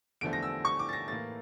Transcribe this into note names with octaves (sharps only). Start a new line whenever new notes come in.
E2 D3 F3 A3 D7
A#6
E6
C#6
D6
A6
A#6
A2 E3 A#3 A6